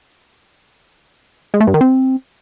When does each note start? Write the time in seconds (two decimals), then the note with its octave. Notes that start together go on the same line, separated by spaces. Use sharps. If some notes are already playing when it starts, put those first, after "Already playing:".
1.54 G#3
1.60 A3
1.67 G2
1.74 D#3
1.81 C4